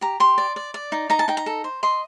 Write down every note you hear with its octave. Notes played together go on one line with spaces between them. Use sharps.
G4 A#5
G4 C6
D5
D5
D5
D#4
D#4 A#5
A5
D#4 G5
A#5
A4
C5
D#5 C6